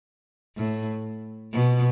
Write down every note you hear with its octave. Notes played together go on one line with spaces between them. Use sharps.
A2
B2